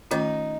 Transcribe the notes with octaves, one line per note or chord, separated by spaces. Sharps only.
D#3 A3 C#4 D#4 F4